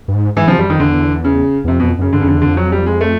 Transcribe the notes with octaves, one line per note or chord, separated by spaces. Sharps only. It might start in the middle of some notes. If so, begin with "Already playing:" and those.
G2
G#2
G#2 E3
C3 F3
F#2 G3
F2 D#3
E2 D3
C#3
E2
F2 C3
B2
F2
F#2 C#3
G2 D3
C#3
F2
D3
E2
F2 D3
F#3
G3
G#3
A3